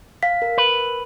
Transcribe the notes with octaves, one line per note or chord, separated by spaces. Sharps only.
F5 B6
A#4
B4